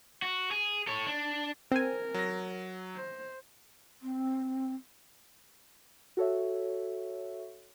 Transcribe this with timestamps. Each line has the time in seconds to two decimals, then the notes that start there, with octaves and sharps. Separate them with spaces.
0.22 F#4
0.51 G#4
0.87 A4 C#5
1.07 D4
1.72 C4 A#4 G#5
2.14 F#3 A#6
2.96 C5
4.02 C4
6.17 F#4 A4 C#5 E5